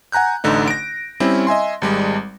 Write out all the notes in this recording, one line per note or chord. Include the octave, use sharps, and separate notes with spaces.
F#5 G#5 A#5 F#6 G6
A1 D3 A3 D#4
A#6 D7
G3 C4 C#4 E4
D#5 E5 G#5 C6
G#1 G3 G#3